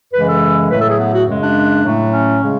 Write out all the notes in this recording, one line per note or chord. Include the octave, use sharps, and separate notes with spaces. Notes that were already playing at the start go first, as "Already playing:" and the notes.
F#2 C#3 E3 G#3 B4
A4
A2 F#3 A3 B4
A4
G#4
B3
F#4
F#2 C#3 G#3
D4
A2 F#3 A3
C#4
C#3 G#3